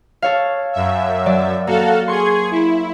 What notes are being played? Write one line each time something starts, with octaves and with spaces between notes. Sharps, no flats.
A4 C#5 F5
F#2 E5
F#3 D5
A#3 F#4 A4 F5
G#4 C6 C#6 G#6
E4